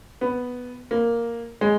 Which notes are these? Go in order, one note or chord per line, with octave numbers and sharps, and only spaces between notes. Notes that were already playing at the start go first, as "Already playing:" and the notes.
B3
A#3
G#3